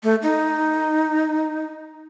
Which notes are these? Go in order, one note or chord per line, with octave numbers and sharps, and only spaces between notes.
A3
D#4